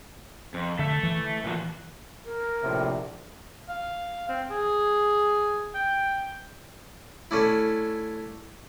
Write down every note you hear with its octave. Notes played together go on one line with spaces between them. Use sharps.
F2
D3 A4 E5
E3
A#2 F3 F#4
A#4
A#1 A2 C3
F5
C4
G#4
G5
A3 C#4 D4 E4